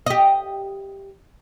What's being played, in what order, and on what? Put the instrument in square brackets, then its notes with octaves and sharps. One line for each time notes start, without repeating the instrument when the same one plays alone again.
[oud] G4 D#5